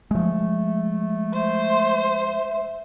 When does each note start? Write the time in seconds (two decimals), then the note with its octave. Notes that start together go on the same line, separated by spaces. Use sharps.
0.11 F3 G#3 A3
1.33 C5 E5